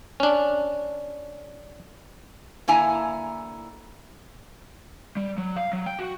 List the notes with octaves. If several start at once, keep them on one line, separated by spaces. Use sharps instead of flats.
C#4 D4
D3 A#3 E4 G#5 A#5
G3
F#3
F5
F#3
G5
F#4